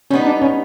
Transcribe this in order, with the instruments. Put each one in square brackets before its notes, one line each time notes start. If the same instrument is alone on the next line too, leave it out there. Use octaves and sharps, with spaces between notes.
[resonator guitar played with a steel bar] G3 B3 D#4 [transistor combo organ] C#4
[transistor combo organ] D4
C#4